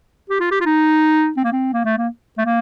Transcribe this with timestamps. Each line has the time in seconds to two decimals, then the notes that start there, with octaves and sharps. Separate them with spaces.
0.29 G4
0.40 F4
0.51 G4
0.60 F4
0.65 D#4
1.37 C4
1.44 A#3
1.52 C4
1.73 A#3
1.85 A3
1.97 A#3
2.38 A3
2.45 A#3